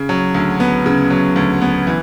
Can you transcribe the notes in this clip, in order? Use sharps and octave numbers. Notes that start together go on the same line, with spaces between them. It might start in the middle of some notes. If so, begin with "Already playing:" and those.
Already playing: C#3
F#3
D2
B3
C#3
F#3
D2
B3
E3